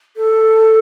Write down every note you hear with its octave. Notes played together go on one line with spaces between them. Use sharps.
A4